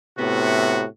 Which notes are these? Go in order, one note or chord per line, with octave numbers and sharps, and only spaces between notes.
A2 C3 B3 F#4